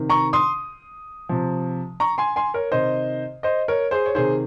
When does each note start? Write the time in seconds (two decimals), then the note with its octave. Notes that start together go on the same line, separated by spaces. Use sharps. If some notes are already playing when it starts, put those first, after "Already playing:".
Already playing: C3 D#3
0.10 A#5 C#6
0.33 C6 D#6
1.29 C3 F3
2.00 A#5 C#6
2.18 G#5 C6
2.36 G#5 C6
2.54 A#4 C#5
2.72 C3 D#3 C5 D#5
3.43 C5 D#5
3.68 A#4 C#5
3.91 G#4 C5
4.06 C#5
4.15 C3 D#3 G#4 C5